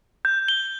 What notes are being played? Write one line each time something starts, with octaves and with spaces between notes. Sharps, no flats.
G6
G7